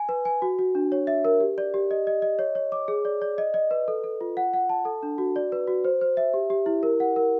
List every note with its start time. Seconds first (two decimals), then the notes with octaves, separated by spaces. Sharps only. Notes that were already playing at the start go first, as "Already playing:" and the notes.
Already playing: G#5
0.09 B4
0.25 G#5
0.42 F#4
0.59 F#4
0.75 D4
0.92 C#5
1.07 E5
1.25 A#4
1.40 G4
1.58 D5
1.74 G4
1.91 D#5
2.07 D#5
2.22 D#5
2.39 C#5
2.55 C#5
2.72 D6
2.88 G#4
3.05 D5
3.22 D5
3.38 D#5
3.54 D#5
3.71 B4
3.88 A4
4.04 A4
4.21 F4
4.37 F#5
4.53 F#5
4.69 A5
4.85 A4
5.03 D4
5.18 F#4
5.36 D5
5.52 B4
5.67 F#4
5.84 C5
6.01 C5
6.17 E5
6.34 G4
6.50 G4
6.66 E4
6.83 A#4
7.00 F#5
7.16 A#4